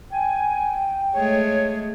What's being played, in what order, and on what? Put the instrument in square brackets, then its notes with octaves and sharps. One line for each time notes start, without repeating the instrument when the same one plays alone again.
[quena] G5 [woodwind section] G#5
[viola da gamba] G#3 A3 [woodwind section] C#5